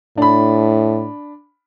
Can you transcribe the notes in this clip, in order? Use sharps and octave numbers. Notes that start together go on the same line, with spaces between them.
A2 D4 B5